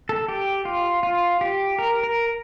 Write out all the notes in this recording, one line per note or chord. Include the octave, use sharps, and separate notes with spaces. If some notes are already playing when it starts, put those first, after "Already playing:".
A4
G4
F4
F4
G4
A#4
A#4